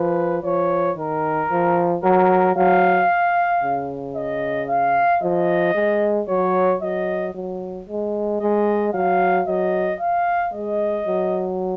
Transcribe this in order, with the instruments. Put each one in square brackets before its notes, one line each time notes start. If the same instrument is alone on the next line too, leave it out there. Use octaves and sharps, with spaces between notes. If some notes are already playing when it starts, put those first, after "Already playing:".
Already playing: [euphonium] F3 [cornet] B4
[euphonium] F3 [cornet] C#5
[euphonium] D#3 [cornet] A#4
[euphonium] F3
[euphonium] F#3 [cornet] A#4
[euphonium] F#3 [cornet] F5
[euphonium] C#3
[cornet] D#5
F5
[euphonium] F3 [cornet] D#5
[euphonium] G#3
[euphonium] F#3 [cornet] C#5
[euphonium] F#3 [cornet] D#5
[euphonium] F#3
G#3
[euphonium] G#3 [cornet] D#5
[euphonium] F#3 [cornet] F5
[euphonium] F#3 [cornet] D#5
[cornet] F5
[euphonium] G#3 [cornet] D#5
[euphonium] F#3